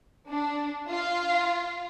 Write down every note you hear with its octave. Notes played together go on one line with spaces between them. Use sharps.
D4
F4